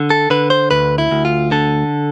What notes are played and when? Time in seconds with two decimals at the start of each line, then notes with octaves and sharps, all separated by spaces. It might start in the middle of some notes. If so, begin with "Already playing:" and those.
Already playing: D3
0.10 A4
0.30 D3 B4
0.50 C5
0.71 D2 B4
0.98 E4
1.11 D2
1.25 F4
1.51 D3 A4